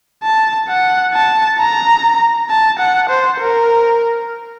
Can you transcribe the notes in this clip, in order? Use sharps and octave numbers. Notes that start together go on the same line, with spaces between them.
A5
F#5
A5
A#5
A5
F#5
C5
A#4